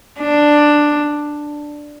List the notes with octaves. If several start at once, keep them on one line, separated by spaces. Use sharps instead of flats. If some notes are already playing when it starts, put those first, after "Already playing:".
D4